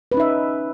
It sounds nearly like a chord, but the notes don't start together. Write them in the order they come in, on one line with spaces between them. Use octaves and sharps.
B4 C#4 D#4 E5